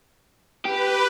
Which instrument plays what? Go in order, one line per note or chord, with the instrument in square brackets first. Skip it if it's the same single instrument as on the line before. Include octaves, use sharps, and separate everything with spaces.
[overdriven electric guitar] G4 [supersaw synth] B4